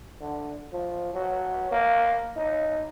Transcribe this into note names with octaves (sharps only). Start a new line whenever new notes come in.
D3
F3
F#3
A#3
D#4